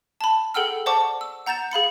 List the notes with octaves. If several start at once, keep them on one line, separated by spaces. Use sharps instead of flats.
A5 B5
G#4 A4 F#5 G5 E6 F6
C5 D5 F#5 A5 C#6 D6
E6
F#5 A#5 G6 A6 E7
G#4 F5 B5 C#7